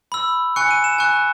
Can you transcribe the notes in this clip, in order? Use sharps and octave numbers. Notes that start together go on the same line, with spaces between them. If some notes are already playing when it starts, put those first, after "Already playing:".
B5 E6
G#5 C#6 F#6 C#7
D#7
E7
G#5 C#6 F#6